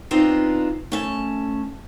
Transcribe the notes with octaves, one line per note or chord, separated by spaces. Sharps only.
B3 C4 D4 D#4 F4
A3 C#4 A5